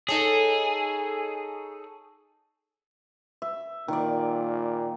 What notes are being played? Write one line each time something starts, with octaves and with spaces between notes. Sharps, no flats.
D#4 G#4 A4 C#5
E5
A#2 D#3 D5